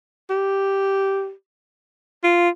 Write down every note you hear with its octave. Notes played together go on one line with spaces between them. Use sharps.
G4
F4